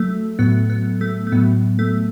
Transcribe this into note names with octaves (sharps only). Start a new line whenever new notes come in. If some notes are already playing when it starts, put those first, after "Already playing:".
Already playing: F#3 A3
A2 F#3 B3
B3
A3
A3
A2 F#3 B3
A3